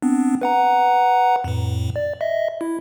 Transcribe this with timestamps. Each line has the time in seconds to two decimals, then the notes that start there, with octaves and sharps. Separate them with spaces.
0.02 B3 C4 D4
0.41 B4 F#5 A#5
1.44 F2 A2
1.96 D5
2.21 D#5 E5
2.61 E4